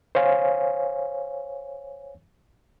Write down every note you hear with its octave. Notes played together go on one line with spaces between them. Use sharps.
C5 C#5 F5 G#5